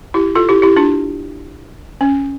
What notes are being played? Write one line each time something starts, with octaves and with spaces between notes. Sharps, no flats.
E4 G4
F4 A4
E4 G4
E4 G4
D4 F4
C#4